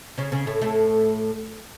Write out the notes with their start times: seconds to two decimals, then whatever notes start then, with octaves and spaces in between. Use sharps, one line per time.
0.18 C#3 C#4
0.32 C#3 C#4
0.47 A2 A3
0.61 A2 A3